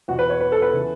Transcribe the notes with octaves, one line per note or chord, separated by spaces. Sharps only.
E2 B2 F#4
B4
C#5
B4
A4
B4
C#3 E3